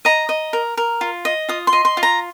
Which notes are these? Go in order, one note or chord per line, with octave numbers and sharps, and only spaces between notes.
D#5 A#5
D#5
A#4
A#4
F4
D#5
F4 D#6
C6
D#5
C6
F4
A#5